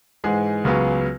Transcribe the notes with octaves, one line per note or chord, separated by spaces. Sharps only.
G#2 E3 G#3 G#4
C#2 C#3 F#3 B3